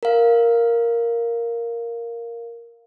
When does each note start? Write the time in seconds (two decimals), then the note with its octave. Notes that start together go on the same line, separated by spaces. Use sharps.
0.03 A#4 F5